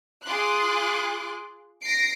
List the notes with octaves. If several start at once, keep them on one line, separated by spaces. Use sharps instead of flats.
F4 G#4 C6 D6 F#6
A#6 C7 D7